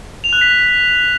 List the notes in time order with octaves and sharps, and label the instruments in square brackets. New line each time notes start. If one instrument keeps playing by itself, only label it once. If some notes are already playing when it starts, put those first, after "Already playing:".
[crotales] F7
F#6
B6